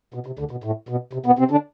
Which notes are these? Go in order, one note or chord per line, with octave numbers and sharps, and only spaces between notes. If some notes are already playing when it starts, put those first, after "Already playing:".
B2
C3
D2 D3
B2
A2
B2
C3
B2 B3
C3 C4
D3 D4